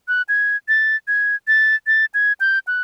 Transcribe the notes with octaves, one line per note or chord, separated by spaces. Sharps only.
F#6
G#6
A6
G#6
A6
A6
G#6
G6
F#6